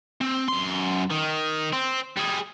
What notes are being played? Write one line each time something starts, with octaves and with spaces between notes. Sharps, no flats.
C4
F#2 C6
D#3
C4
G3 G#4